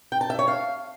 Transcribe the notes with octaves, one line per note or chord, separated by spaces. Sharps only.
G5
A5
E5
C#5
F5